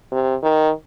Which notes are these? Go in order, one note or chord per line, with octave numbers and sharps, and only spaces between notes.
C3
D#3